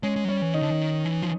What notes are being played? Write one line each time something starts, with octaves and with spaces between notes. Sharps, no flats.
G#3 C#4 C#5
G#3
F#3
G3 C#4 C#5
E3
D#3 D#4 D#5
D3
D#3
E3
F3